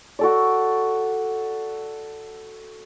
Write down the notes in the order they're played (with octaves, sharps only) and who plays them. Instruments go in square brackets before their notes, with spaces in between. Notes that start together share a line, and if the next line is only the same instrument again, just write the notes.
[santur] F#4 A4 D5